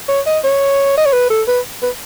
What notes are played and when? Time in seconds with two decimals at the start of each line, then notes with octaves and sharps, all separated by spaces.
0.08 C#5
0.26 D#5
0.44 C#5
0.98 D#5
1.05 C#5
1.13 B4
1.30 A4
1.48 B4
1.82 B4